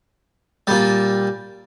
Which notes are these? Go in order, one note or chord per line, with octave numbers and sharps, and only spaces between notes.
A#2 G3